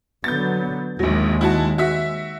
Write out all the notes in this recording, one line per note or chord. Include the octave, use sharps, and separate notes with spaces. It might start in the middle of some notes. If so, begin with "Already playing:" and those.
D3 F#3 B3 G6 A6
A#1 D#2 F#3 G#3
E4 F#4 A5
F#4 E5 B6